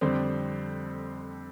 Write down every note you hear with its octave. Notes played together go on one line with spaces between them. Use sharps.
F2 D3 G3 C4 C5